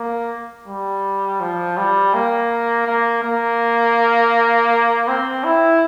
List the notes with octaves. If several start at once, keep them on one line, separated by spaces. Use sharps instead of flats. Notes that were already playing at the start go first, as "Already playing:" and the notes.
Already playing: A#3
G3
F3
G3
A#3
A#3
A#3
C4
E4